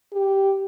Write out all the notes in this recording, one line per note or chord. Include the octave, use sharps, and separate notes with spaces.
G4